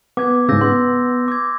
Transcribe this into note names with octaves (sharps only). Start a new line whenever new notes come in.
B3 D6 G#6
G#2 C#3 E6 G6 A#6
B3 C6 D6
D6 G#6